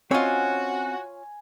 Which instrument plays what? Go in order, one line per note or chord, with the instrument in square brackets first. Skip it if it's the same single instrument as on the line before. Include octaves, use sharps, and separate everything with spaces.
[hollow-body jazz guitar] C4 C#4 D#5 [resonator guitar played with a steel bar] F4 C#5 [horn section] F#4 [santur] G#5